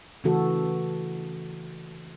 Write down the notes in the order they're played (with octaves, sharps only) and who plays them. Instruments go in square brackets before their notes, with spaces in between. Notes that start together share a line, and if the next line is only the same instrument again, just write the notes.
[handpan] C#3 E3 A3 F#4 A4